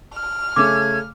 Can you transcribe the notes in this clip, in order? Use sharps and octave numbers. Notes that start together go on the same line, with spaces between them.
F6
C#3 A3 C#4 D6 G#6